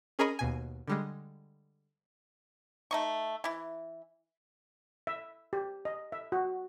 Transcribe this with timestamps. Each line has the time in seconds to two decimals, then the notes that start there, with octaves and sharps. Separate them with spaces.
0.19 C#4 G#4 A#4 D#5 B5 C#6
0.39 D#2 B2 G#5
0.88 D3 G3 G#3
2.91 A3 D#4 C#6
3.44 E3 E4
5.07 E5
5.53 G4
5.85 D#5
6.12 E5
6.32 F#4